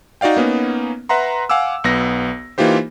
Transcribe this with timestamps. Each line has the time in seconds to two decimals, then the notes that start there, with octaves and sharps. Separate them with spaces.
0.21 D#4 F#4 D5 F5 G5
0.37 A#3 B3 C#4 D#4
1.09 B4 E5 F#5 A#5 C6
1.49 F5 F#5 G#5 D6 E6
1.84 B1 B3 A#6
2.58 E3 A#3 D#4 F4 G4 C5